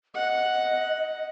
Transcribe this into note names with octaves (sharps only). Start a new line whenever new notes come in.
D#5 F#5